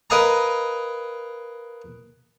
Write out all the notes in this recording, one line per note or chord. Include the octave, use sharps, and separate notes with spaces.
A#4 B4 D#5 F5 G#5 A#5